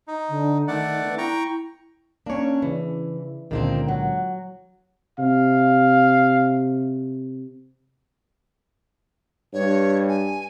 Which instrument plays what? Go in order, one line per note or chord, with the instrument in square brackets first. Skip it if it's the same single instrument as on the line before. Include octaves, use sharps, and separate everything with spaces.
[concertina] D#4
[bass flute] D3
[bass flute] D#3 [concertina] A3 D5 F#5
[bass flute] B3
[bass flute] E4 [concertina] G5 A#5 C#6
[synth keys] A#3 C#4 [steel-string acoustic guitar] D4 C#5
[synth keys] C#3 [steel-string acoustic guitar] E3
[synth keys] C#2 A#2 D3 [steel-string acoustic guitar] D#3 A#3 C4
[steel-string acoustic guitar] F#3 [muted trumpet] F#5
[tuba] C3 [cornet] F5
[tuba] G2 [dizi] C#5
[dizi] G#5